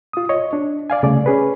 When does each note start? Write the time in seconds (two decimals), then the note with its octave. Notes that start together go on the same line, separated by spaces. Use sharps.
0.13 F4 D#6
0.29 C#5 D#5
0.53 D4
0.90 D5 F5 G#5
1.03 C2 C#3 A3 D5
1.26 C#4 G#4 B4